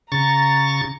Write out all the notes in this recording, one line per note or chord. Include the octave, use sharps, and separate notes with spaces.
C#3 A#5 C#6 A6